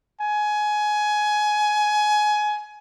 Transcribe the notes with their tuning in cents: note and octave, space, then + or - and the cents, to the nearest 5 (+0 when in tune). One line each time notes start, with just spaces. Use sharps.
G#5 +20